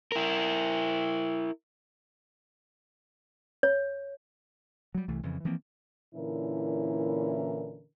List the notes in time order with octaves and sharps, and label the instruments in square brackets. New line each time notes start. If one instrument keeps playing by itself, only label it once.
[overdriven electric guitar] E4 A#4
[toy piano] C#5
[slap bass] F#3 G3
C2 E3 A3
F2 C#3 E3
E3 F3 A#3 C4
[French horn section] A#2 D3 E3 C#4 E4 A#4